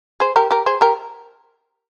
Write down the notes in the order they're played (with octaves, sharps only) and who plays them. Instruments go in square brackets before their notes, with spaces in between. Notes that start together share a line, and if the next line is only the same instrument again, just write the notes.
[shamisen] G#4 C5
G4 A#4
G4 A#4
G#4 C5
G4 A#4